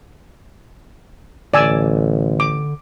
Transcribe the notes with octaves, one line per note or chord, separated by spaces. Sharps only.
A1 D3 D5 G#5 E6
D6